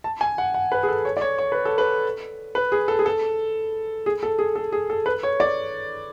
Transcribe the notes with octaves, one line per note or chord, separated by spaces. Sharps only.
A5
G#5
F#5
F#5
B4
G#4
A4
C#5
D5
C#5
C#5
B4
A4
B4
B4
G#4
A4
G#4
A4
G#4
A4
G#4
A4
G#4
A4
B4
C#5
D5